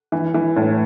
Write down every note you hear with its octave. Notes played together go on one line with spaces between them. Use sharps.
E3
E3
A2